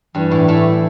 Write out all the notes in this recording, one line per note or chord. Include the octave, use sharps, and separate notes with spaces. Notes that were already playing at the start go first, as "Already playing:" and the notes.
G2 E3 G3
A2 A3
A2 A3